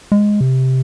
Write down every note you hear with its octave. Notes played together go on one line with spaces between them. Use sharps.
G#3
C3